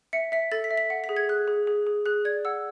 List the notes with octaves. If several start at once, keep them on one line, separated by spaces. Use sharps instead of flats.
E5 C#7
E5 B6
A4 A6
B6
E5
B6
F#5
B6
G#4
G#6
G#4 F#6
G#4
G#4
G#4
G#4 F#6
D5 G#6
F#5 E6